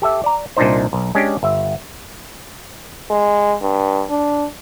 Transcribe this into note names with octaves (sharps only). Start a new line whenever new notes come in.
G4 A4 E5
D5 A#5
C2 A#2 D4 D#4 C5
B1
G#3 C#4 D4 G4
G1 E5
G#3
G2
D4